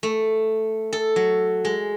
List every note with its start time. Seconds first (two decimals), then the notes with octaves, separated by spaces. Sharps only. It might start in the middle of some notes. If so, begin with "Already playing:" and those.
0.03 A3
0.93 A4
1.16 F#3
1.65 G#3